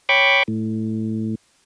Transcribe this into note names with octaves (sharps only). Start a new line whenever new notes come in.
C#5 G5 B5 C#6 D6
A2